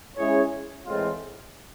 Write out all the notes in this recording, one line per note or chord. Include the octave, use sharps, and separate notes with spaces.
G#3 C#4 E4 G#4 C#5
A2 E3 G#3 C4 F4